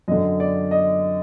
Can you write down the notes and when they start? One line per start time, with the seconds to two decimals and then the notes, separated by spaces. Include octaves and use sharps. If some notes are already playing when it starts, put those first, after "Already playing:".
0.08 F#2 D3 D#5
0.40 D5
0.71 D#5